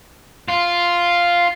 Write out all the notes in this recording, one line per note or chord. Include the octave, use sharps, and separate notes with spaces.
F4